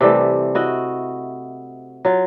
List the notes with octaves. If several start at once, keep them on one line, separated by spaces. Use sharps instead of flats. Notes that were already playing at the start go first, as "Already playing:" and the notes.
C3 E3 G3 A3
E4 F#4 D#5
F#3 F4